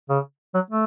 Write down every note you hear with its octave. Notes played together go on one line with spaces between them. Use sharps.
C#3
F#3
A3